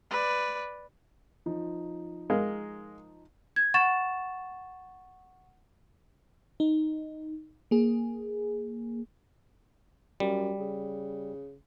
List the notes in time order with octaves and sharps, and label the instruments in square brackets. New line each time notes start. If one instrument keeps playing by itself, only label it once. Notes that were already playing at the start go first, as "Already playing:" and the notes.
[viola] B4 D5
[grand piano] F3 D#4
[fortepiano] G#3 A#4 F5
[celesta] G#6
F#5 C#6 A6 E7
[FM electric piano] D#4
A#3 G#4
[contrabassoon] F#2 [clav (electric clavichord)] G3
[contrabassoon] C#3